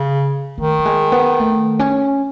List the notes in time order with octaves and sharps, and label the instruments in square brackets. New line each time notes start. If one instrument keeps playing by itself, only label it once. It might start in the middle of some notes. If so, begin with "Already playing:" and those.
Already playing: [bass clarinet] C#3
[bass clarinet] D#3 [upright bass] A3
[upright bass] F#3
G#3
B3
A3
C#4